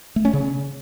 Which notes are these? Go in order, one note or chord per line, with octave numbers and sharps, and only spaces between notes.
A3
C#4
C#3